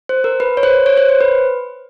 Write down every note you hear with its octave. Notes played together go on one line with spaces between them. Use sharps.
C5
A#4
B4
C#5
C5
C#5
C5
C5
B4